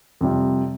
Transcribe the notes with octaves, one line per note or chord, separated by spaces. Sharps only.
F2 C3 G3